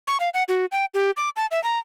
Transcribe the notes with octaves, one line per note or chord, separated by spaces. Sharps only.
C#6
F5
F#5
F#4
G5
G4
D6
A5
E5
A#5